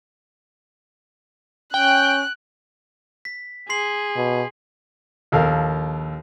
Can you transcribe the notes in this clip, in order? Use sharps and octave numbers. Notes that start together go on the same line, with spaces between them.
C#4 G5 F#6
B6
G#4 C6 C7 F#7
B2
A#1 D#2 A4 A#4 F5